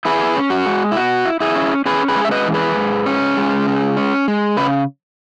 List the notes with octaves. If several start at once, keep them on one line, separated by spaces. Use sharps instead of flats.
E4 G#4 B4
C#4
F#4
G#3
E4
B2 F#4
E4
E4 G#4
C#4
C#4 G#4 B4
G#4 B4
G#3
E5
B4 D#5
E3
G#4 B4
G#2
C#4
G#3
C#3
C#4
G#3
C#3 B4